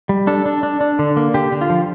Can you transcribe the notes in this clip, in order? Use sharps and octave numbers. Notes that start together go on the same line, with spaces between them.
G3
D4 A4
D4
D4
D4
D3
A#3
D3 G4
D3
F4
F3